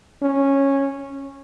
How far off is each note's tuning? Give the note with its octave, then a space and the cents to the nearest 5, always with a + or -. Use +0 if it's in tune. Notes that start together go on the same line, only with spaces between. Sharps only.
C#4 -10